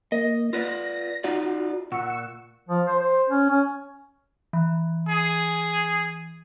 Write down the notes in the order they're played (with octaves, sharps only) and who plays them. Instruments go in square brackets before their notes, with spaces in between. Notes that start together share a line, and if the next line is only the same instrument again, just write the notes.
[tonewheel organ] A#3 [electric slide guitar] D#5
[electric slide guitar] F4 B4 D5 [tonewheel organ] A#6
[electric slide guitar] D#4 F4 D5 [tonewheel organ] F#4
[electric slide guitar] A#2 [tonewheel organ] F#5 C#6 E6
[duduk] F3
C5
C5
C#4
C#4
[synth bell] E3
[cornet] G#4